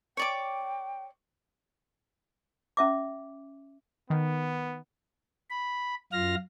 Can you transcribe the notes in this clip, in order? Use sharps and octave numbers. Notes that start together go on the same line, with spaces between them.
C#5 D5 G5 D6
C#4 E5 D6
D#3 B3
B5
F#2 F4 F5 F6 A#6